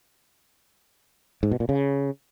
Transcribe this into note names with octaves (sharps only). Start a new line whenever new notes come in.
G#2
B2
A#2
C#3